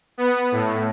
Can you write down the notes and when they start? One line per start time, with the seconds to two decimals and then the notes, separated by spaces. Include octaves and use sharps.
0.18 B3
0.52 A2